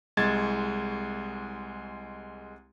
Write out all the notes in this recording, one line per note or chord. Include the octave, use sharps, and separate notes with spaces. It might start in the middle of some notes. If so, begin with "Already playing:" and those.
C2 G#3 A5 G#6 A6